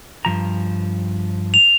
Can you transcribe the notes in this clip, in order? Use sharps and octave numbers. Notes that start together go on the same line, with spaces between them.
G2 F3 A#5
F7